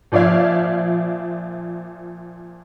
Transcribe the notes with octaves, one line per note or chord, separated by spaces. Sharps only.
A#2 F3 D5 E5 F5 G#6